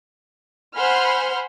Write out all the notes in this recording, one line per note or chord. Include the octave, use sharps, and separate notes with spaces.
C5 F#5 G#5 B5 C6 F6